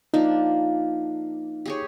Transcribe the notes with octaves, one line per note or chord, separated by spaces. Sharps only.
F3 A#3 D4 D#4
G4 G#4 C#5